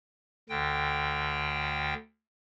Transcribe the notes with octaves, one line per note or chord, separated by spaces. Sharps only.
D2 D3 G5